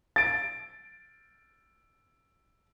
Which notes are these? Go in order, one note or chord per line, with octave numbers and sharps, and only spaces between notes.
A6 D7